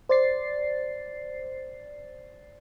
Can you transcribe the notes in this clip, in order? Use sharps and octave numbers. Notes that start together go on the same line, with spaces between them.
C5 D5 A6 C7